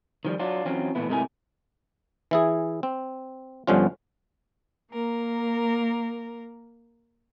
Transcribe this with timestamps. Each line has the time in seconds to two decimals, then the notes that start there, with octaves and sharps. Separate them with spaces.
0.25 D#3 F3 G3
0.39 F#3 D4 F4
0.65 E3 F#3 C4 C#4 F4
0.95 A#2 E3 A3 B3 E4
1.09 G#2 C3 A3 E4 A#4 G#5
2.31 E3 E4 G#4
2.83 C4
3.67 G1 G2 D3 F3 C#4 F4
4.90 A#3 A#4